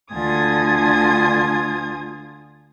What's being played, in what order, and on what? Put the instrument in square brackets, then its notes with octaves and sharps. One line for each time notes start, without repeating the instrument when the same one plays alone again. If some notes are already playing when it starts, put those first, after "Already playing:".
[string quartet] D2 D3 F4 G#5 D#6 G#6